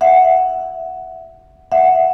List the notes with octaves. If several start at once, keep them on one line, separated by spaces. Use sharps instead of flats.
E5 F#5
E5 F#5